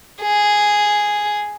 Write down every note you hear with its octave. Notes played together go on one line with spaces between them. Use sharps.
G#4